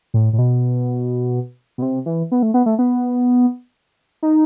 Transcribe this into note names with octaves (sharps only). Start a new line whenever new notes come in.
A2
A2
B2
B2
C3
E3
B3
A3
B3
A3
B3
D#4